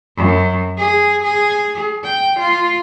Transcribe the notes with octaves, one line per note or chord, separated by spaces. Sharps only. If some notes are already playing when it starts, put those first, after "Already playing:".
F#2
G#4
G#4
G5
F4